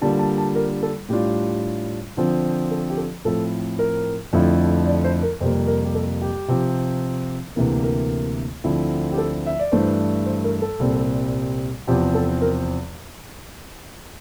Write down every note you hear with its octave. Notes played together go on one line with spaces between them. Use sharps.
D3 G3 A#3 F4 A5
A5
A5
A#4
A4
A2 G3 D4 F4 G4
D3 F3 C4
A4
G4
A4
A2 F3 C4 E4 A4
A#4
F2 D3 F3 A3 E4
D5
C5
A#4
F2 C3 G3 A#3 C5
A#4
G4
A4
G4
C3 F3 C4
D2 C3 E3 A#3
A#4
D2 D3 F3 C4 E4
G4
A4
E5
D5
G2 E3 A3 D4 C5
C5
A#4
A4
C2 A#2 G3 C4
E2 C3 F3 C4 G4
A4
A#4